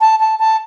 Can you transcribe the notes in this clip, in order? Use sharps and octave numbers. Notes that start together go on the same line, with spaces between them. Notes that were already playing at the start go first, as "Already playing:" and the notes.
A5
A5
A5